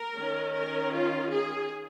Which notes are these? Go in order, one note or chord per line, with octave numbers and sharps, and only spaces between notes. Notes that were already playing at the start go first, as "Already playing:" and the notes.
Already playing: A#4
D#3 C#4
A#4
F4
G#4